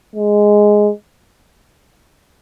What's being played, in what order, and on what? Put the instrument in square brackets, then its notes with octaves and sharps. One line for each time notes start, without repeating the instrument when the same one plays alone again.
[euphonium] G#3